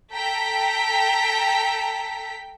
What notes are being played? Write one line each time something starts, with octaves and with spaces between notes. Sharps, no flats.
A4 G5 A#5 B6